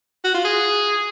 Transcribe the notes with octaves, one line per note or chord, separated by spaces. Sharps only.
F#4
F4
G#4